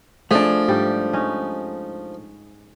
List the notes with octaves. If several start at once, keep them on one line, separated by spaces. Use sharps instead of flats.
F3 A3 D4 G#4
G#2 G3 G4
C#4 D#4